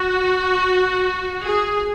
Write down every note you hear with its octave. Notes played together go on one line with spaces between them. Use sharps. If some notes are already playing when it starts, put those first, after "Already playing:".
Already playing: F#4
G#4